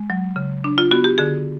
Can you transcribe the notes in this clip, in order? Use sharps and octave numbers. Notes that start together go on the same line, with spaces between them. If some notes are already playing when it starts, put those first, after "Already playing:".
Already playing: G#3
F#3
C#3
D4
F4
B3 F#4
G4
D3 G#4